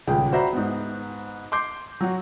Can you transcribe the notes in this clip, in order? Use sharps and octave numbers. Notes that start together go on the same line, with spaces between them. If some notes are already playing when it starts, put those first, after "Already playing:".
D#1 C#2 G#4 G5
F#4 C5 D5 E5 A#5 B5
G#2 B3
C6 D6 G6 C7
F#3 F#4